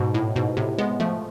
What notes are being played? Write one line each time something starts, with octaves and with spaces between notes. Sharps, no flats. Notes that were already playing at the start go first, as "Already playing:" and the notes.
Already playing: G#2 B2
A2
G#2 B2
A2 C3
G#3 B3
F3 A3